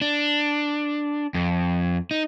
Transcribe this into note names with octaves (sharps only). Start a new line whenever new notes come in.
D4
F2
D#4